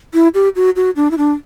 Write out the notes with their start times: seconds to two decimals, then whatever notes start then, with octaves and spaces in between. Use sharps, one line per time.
0.14 E4
0.34 G4
0.56 F#4
0.76 F#4
0.96 D4
1.11 E4
1.18 D4